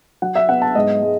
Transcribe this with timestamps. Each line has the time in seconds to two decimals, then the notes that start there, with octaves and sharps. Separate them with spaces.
0.22 F#3 F#5
0.35 E5
0.49 B3 F#5
0.62 A5
0.75 G#2 D#5
1.02 G#3